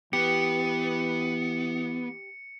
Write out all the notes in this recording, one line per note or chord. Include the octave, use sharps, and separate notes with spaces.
E3 B3 G4 C#7